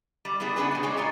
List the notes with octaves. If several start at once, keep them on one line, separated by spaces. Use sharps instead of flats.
G3
G3 B3 E4 G#4
C#3 B3 D4 G#4 B4
B2 G#5
G#3 D#4 C#5 D5
A#2 F4 D5 G#5